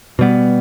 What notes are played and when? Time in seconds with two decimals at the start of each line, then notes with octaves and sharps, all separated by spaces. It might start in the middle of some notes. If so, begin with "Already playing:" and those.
0.19 B2 G3 B3